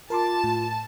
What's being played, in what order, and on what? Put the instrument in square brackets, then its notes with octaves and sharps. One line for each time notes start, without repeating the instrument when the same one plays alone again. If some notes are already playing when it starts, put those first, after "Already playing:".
[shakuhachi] F4 [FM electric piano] A#4 C6 D6 [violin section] A5
[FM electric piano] A2